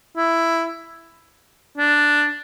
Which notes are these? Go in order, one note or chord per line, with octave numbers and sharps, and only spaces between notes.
E4
D4